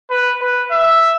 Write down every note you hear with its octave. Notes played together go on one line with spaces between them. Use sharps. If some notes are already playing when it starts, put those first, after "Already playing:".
B4
B4
E5